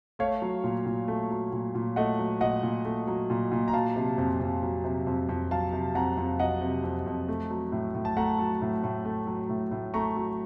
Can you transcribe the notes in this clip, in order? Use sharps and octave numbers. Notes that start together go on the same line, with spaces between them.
A3 C#5 F5
F#3
A#2
A#2
A3
F#3
A#2
A#2
A3 D#5 F#5
F#3
A#2 D#5 F#5
A#2
A3
F#3
A#2
A#2
A#5
F#3 F5 A5
C3
F2
F2
F#3
C3
F2
F2
F#3 F5 A5
C3
F2 F#5 A#5
F2
F#3 D#5 F#5
C3
F2
F2
A3
F#3
A2
A2
A5
A3 F#5 A#5
F#3
A2
A2
A3
F#3
A2
A2
A3 A#5 C#6
F#3